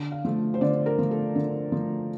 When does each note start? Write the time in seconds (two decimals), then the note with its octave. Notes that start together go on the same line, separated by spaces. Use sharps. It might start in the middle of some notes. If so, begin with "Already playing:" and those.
Already playing: D3
0.12 F5
0.25 F3 A3
0.54 C5
0.61 D3 D5
0.86 A#4
0.99 F3 A3
1.11 A4
1.35 D3
1.72 F3 A3